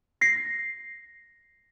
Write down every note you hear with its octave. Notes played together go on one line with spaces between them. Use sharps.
A#6 C7